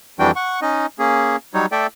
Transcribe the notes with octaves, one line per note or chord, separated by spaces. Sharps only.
F2 E3 G3 D4 F#4 G5
F#5 C#6
C#4 D#4 D#5
A#3 C#4 G#4
F#3 G3 D#4 C#5
A3 A4 D5 E5 G5